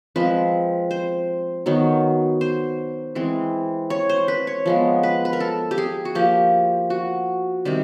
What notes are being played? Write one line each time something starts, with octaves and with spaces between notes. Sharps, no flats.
F3 G#3 C4 B4
C5
D#3 F#3 B3
C5
E3 G#3 C4
C#5
C5
B4
C#5
F3 G#3 B3
B4
B4
A#4
A4
G4
G#4
F#4
F3 A#3 G4
F#4
C3 D#3 G3